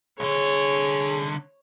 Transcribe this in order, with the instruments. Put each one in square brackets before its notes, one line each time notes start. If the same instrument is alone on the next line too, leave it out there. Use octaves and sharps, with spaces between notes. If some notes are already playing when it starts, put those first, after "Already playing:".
[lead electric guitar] C2 D3 [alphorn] G#4 [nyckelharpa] C#5